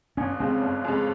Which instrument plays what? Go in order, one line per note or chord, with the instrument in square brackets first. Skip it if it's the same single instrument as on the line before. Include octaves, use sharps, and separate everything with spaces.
[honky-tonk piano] G1 [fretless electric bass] C#4
[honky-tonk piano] F2 C#3 G#3 [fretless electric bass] C4
[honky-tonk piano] G1
F2 C#3 G#3